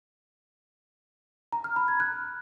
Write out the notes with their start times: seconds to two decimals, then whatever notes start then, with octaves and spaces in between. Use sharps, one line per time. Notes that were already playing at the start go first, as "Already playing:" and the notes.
1.53 A#5
1.64 F6
1.76 B5
1.88 G#6
2.00 F#6